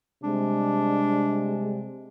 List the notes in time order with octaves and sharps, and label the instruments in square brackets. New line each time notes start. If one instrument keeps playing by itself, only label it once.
[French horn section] C3 G3 G#3 [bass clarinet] D4